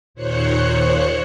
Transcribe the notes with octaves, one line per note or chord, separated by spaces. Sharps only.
D#2 A#2 C5 C#5 F#6 C#7